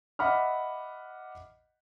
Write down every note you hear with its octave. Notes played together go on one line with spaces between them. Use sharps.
D#5 E5 F#5 B5 D6 F6